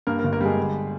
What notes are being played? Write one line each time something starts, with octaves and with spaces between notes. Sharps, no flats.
G2 A#3 A#4
A#3 A#4
G1
A#3 A#4
G3 G#3 G#4
D3